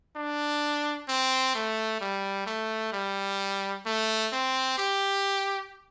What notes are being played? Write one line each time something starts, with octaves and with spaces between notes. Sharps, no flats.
D4
C4
A3
G3
A3
G3
A3
C4
G4